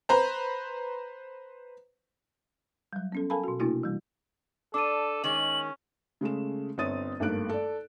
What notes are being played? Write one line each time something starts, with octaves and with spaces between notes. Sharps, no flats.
B4 C5 A#5
F#3 G3
B3 C#4 A4
A4 A#4 F5 G#5 A5 B5
B2 F#4
C3 A3 A#3 D4 E4 F#4
E3 G3
D4 A4 D6 D#7
D#3 G#3 C#4 F#7
C#3 G#3 A3 E7
G1 C4 C#5 D#6 A6 D#7
G#1 G2 A3 A#3 F#6 D7
A4 D5